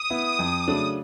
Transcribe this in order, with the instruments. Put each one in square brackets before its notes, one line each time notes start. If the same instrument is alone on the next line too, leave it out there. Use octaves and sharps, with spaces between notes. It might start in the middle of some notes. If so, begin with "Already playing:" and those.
Already playing: [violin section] D#6
[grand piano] B3 E4
F2
C#3 F#3 A3 D4